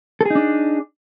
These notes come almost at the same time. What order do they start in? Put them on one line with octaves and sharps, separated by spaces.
A4 G#4 D#4 D4